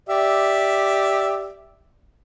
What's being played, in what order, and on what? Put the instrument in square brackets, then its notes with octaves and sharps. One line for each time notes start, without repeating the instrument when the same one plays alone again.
[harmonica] G4 D5 E5